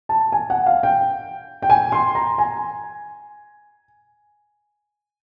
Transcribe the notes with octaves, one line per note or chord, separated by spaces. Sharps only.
A5
G#5
F#5
F5
G5
G5
G#5
C6
A#5
G#5